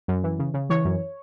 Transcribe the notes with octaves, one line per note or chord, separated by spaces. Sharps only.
F#2
E3
C#3
C#3
E3 C#5
F#2